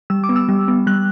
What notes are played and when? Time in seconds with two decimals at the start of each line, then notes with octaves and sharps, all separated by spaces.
0.10 G3 E6
0.24 D6
0.29 B3
0.36 E6
0.49 G3
0.68 B3
0.87 G3 F#6